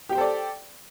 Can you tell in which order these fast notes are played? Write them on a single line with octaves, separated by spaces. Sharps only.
G4 G5 C5 A4 D5